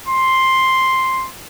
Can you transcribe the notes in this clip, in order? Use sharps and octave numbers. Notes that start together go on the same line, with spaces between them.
C6